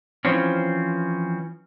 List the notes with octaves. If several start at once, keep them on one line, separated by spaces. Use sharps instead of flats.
E3 F3 C4 C#4